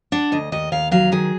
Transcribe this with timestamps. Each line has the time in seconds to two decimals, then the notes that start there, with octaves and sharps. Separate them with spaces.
0.12 D4 F#5
0.32 D2 D#5
0.52 D#2 D#5
0.72 D#2 F5
0.92 F#3 F5
1.12 D#3 G#4